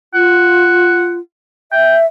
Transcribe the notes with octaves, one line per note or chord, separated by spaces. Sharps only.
F4 F#5
E5 G5